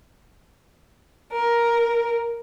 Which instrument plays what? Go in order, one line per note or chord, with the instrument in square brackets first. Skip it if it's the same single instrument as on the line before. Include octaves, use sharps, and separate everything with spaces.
[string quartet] A#4